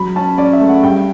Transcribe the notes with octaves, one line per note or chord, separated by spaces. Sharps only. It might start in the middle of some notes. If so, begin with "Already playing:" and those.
Already playing: F#3 B5
C#4 A5
C#4 D5
E5
A3
F#5
G2 G5